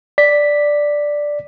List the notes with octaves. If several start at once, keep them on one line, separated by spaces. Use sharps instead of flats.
D5 B6